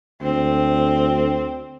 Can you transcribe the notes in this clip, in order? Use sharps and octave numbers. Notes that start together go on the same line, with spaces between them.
D2 C4